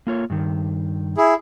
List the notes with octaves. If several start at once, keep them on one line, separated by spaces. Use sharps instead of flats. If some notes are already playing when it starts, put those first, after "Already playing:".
A#3 F4 C#5
G2 D#3
E4 G#4